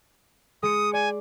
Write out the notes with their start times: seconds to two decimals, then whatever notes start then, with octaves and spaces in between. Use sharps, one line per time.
0.63 G#3 D#6 C#7
0.93 D5 G#5